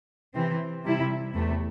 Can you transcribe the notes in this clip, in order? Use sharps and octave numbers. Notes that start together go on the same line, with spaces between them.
C3 E3 C4
C3 G3 E4
E2 C3 A3